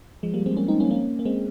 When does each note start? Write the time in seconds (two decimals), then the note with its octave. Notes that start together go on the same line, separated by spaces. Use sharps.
0.23 F3 G#3
0.34 G3 A#3
0.46 G#3 C4
0.57 A#3 C#4
0.68 C4 D#4
0.80 A#3 C#4
0.91 A#3 C#4
1.19 A#3
1.25 G#3 C4